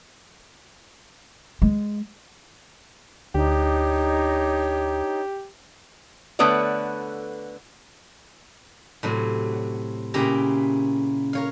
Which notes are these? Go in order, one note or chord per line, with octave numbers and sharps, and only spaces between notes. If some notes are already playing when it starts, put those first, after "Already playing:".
G#3
D2 D4 D#4 G4 C#5
D3 A3 B3 B4 C#5 D5
A2 C3 F#3
A#2 C#3 E4 G4 A#5
A#4 C#5 F5